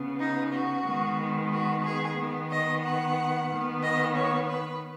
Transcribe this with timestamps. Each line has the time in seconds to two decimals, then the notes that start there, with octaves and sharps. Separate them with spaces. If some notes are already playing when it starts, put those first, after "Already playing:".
Already playing: C#3 B3
0.19 D#4
0.52 F#4
0.85 D#3 G#3 B3
1.51 F#4
1.84 G#4
2.17 D#3 B3
2.50 D#5
2.83 F#5
3.49 D#3
3.54 B3
3.82 D#5
4.15 C#5
4.49 B4